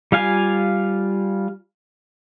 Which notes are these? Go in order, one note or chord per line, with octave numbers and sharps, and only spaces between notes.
G3 F4 F5 G#5